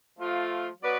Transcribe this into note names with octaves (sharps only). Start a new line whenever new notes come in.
F3 A3 F4
F#3 B3 F#4 B4 D5